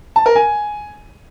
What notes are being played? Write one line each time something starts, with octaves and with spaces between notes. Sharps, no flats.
A5
A#4
G#5